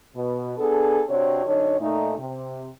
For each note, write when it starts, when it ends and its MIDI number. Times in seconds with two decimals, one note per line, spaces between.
0.16 0.54 47
0.58 1.02 59
0.58 1.02 62
0.58 1.02 68
0.58 1.02 69
1.09 1.42 48
1.09 1.42 60
1.09 1.42 62
1.09 1.42 66
1.09 1.42 73
1.46 1.79 42
1.46 1.79 50
1.46 1.79 63
1.46 1.79 73
1.80 2.14 46
1.80 2.14 57
1.80 2.14 63
2.18 2.68 48